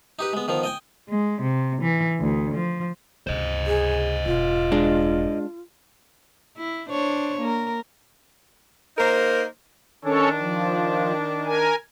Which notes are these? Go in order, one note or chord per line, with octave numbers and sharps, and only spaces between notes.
D#4 G4 B4
G#3 B3
D#3 F3 B3
D#5 G5 G#5
G#3
C3
E3
D2
F3
C#2 C3 C5 D#5
G#4
E1 F4
G#3 D4
E4
D4 C5 C#5
A#3 A#4
A#3 D#4 A#4 C5
D#3 C#4 D4 A4 C#5
F3
A#4 G#5